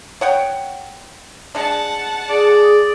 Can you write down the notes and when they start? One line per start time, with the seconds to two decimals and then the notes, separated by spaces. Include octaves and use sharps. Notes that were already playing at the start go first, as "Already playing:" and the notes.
0.21 C#5 F#5 G5
1.55 G#3 D4 F#5 A5
2.29 G#4 D5